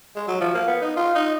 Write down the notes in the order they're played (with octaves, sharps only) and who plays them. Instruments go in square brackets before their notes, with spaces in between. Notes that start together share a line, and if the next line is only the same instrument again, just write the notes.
[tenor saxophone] G#3
F#3
F3
A#3
B3
D#4
F4
D#4